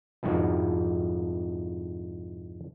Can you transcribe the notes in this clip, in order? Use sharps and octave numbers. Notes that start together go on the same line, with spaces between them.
C2 F2 G#2 F3 F#4